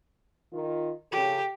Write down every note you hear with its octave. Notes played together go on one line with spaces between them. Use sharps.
D#3 F4
C#3 G4 A4